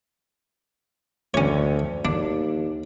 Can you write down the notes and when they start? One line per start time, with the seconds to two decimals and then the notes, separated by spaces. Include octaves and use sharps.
1.34 D2 C#4 C#5
2.05 D#2 D4